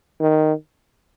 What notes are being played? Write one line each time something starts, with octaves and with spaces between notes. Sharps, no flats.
D#3